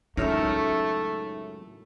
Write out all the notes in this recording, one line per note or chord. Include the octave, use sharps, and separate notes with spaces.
C#2 F#2 A2 A3 D#4 A#4 C#5 E5